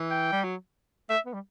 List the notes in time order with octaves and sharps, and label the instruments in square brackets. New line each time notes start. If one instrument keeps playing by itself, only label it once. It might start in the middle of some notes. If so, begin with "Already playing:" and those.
Already playing: [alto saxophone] E3
[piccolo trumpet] G5
[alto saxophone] G3
F#3
[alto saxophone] A3 [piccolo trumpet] E5
[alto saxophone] B3
G3